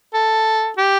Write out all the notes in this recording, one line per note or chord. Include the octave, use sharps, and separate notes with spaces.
A4
G4